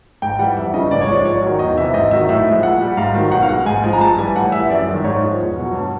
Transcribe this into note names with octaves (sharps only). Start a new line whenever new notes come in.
G#2 G5
E3 G3 F#5
F2 E5
C#3 E3 G3 D#5
G#2 D5
C#5
F3 G#3 D5
G#2 C#5
D#3 F#3
E2 D#5
C3 E3 E5
G#2 D#5
D#3 F#3 E5
A2 E5
F3 G#3
A#2 F#5
G3
G#2 F5
D#3 F#3
B2 F#5
F5
G#3 F#5
G#2 G#5
F3 G#3 G#5
A#5
G2 A5
E3 G3 G#5
A2 F#5
E3 G3 E5
F#2 D5
D#3 G#3
G#2 C#5
F3 G#3
E2
B2 F#3
G2